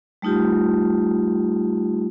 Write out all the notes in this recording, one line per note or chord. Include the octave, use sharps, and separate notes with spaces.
G3 A3 D#4 F4 G4